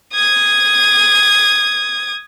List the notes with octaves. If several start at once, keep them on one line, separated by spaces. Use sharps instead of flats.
D#6 G#6